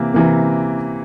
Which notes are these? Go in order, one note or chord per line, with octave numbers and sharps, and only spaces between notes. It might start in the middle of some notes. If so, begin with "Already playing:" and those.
Already playing: C3 E3 A#3
C3 E3 A#3